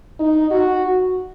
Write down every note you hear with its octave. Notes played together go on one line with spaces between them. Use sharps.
D#4
F#4